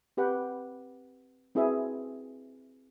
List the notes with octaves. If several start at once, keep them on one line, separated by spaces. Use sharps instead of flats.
C4 G4 B4 F#5 G5
C4 E4 F#4 G#4 B4 E5